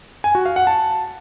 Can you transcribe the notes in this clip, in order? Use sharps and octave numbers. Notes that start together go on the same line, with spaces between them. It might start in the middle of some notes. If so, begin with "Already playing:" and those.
G#5
F#4
F5
F#5
A5